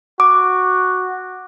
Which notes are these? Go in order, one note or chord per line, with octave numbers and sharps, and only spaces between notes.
F#4 D6